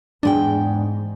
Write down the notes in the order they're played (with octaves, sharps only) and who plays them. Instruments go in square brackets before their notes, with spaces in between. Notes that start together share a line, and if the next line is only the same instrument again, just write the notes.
[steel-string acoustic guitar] E2 G#3 G5 [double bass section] G#2 [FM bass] D4